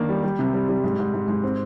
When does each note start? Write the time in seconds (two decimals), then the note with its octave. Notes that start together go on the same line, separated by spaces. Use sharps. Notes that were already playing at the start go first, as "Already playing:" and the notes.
Already playing: D#3 A#3 D4
0.09 G3
0.23 G3
0.39 C3
0.54 G3
0.69 G3
0.84 G#2
0.99 G#2
1.14 G#2
1.28 G#2
1.43 C4